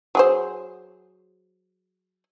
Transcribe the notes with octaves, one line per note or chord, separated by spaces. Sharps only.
F#3 G#4 C5